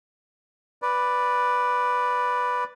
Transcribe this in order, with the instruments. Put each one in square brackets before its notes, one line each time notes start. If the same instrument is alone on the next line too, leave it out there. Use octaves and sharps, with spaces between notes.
[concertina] B4 D5